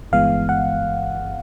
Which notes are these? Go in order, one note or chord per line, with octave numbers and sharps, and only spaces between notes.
G1 G2 E3 G#3 B3 F5
F#5